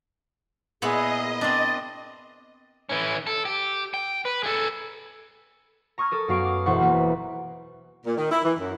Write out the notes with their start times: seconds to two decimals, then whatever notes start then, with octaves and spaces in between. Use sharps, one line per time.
0.82 A#2 B3 E4 G#4 D#5
1.41 C4 D4 A6
2.89 E3 C#4
3.27 A4
3.45 G4
3.94 G5
4.25 B4
4.43 G#4 A4
5.98 A#5 C#6 D#6 F6 G#6
6.11 A4 A#4 D#6
6.28 F#2 B3 F#4 F5 C#6 D7
6.44 D6 D#6
6.66 E1 E4 A4 C5 F#5 C#6
6.80 E3 A#3 B4
8.06 A#2
8.18 D#3
8.30 E4
8.44 E3
8.59 F#2